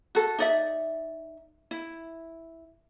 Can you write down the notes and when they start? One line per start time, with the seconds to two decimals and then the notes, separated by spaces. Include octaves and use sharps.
0.15 F#4 A4
0.39 D#4 D5 E5
1.71 E4